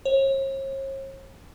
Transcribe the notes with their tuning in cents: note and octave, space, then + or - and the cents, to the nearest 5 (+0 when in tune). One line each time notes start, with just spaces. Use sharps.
C#5 -45